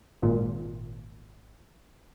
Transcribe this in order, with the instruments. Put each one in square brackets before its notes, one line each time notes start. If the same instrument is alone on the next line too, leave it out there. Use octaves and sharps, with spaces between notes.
[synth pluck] G#1 A#2